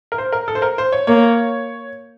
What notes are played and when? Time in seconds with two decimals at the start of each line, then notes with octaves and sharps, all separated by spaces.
0.12 A#4
0.18 C5
0.32 A#4
0.48 A4
0.55 C5
0.62 A#4
0.78 C5
0.92 C#5
1.07 A#3 C#5